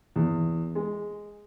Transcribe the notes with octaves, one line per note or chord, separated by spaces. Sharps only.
E2
G#3